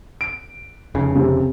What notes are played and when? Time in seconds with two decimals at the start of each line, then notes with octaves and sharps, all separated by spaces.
0.21 D7
0.95 F1 C#3
1.15 C3